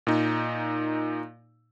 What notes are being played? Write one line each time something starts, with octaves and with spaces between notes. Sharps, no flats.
A#2 D#4